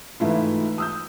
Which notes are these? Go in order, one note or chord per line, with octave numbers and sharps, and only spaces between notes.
G#2 E3 A3 E4 F4
D#6 E6 G6